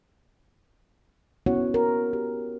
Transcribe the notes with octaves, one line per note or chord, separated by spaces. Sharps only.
B3 C#4 E4 F#4 C#5 F#5
A#4
G4